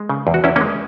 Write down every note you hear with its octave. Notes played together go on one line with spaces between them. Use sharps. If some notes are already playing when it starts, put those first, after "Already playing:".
Already playing: G#3
C#3
E2
F#4
E2 C#4 E4
A#3 C#4
G#3